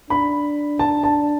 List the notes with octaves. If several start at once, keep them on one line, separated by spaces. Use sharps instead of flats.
D4 B5
A5
A5